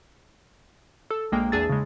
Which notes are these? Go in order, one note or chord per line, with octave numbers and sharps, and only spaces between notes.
A4 E6
A#1 G#3 A#3 G5
E2 D4 G#4 A5 E6 A6
C#3 G#3